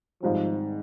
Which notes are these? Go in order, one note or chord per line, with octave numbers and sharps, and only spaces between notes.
G#2 D#3 F3 G3 C4